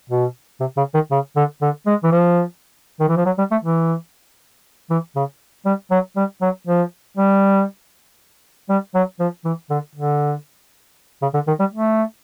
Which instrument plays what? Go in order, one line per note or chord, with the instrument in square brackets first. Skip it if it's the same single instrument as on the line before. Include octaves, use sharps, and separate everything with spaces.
[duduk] B2
C3
C#3
D#3
C#3
D3
D3
G#3
E3
F3
D#3
E3
F3
F#3
G3
A3
E3
E3
C#3
G3
F#3
G3
F#3
F3
G3
G3
F#3
F3
E3
D3
D3
C#3
D3
D#3
G3
A3